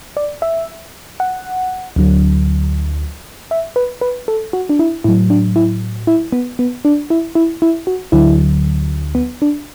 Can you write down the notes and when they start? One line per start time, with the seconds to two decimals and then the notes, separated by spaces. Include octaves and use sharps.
0.17 D5
0.42 E5
1.20 F#5
1.96 D2 D3 F#3
3.51 E5
3.76 B4
4.01 B4
4.28 A4
4.53 F#4
4.69 D4
4.79 E4
5.04 A2 F#3 E4
5.30 D4
5.56 E4
6.07 E4
6.32 B3
6.59 B3
6.85 D4
7.10 E4
7.35 E4
7.62 E4
7.87 F#4
8.12 D2 D3 F#3 E4
9.15 B3
9.42 D4